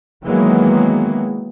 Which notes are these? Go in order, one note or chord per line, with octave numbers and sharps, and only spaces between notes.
D#3 E3 F#3 G#3 A#3 B3